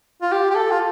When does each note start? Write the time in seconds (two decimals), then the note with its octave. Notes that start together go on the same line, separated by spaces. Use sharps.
0.22 F4
0.32 G4
0.50 G4
0.55 A4
0.71 F4